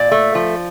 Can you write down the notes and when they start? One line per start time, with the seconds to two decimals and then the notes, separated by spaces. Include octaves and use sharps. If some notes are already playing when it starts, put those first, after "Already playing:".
Already playing: A#2 D5
0.11 A3
0.35 F3